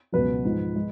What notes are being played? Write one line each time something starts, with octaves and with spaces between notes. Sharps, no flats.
C#2 B2 F#3 B4
G#2 F3 G#3
G#3